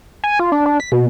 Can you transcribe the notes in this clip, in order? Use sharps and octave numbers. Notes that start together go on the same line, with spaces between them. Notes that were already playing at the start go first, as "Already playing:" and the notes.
G#5
F4
D4
D4
B6
B2